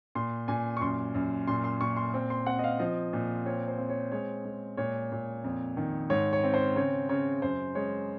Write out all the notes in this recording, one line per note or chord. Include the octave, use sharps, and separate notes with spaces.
A#2 C6
A#2 G#5
C#6
F#2 C6
F#2
A#2 C6
C6
A#2 C#6
C6
C4
C6
C4 F#5
D#5
F5
F3 D#5
A#2
C4 C#5
C5
C4
C#5
G#3 C#5
G#3
A#2 C#5
A#2
F2
D#3
G#2 C#5
C#5
C4
C5
C#3 C#5
C#3 C#5
F#2 C5
G#3 C#5